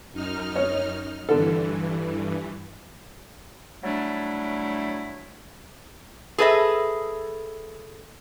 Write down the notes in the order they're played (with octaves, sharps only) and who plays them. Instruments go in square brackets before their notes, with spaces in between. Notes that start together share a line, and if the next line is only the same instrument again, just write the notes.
[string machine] F#2 D#4 F6
[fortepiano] C#5
[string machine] G2 E3 [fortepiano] D3 A4
[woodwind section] F#3 G3 A3 D4 E4
[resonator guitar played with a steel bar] G#4 A4 B4 D#5 E5